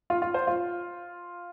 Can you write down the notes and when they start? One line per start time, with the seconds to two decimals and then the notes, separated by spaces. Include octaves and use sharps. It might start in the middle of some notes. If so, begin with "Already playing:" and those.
0.10 F4
0.22 F4
0.34 C5
0.47 F4